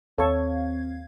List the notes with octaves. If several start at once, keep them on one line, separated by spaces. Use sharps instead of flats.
D#2 C4 A4 C#5 F5 C#6 G#6